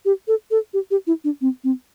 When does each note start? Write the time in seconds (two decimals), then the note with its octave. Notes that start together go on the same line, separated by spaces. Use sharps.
0.05 G4
0.28 A4
0.51 A4
0.74 G4
0.91 G4
1.07 E4
1.24 D4
1.41 C4
1.64 C4